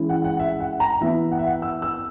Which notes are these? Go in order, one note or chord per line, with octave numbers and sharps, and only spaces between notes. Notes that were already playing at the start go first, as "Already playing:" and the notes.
Already playing: E3 G#3 C#4 E4
F#5
F#5
E5
F#5
A#5
E3 B3 E4 E5
F#5
E5
F#5
E6
E6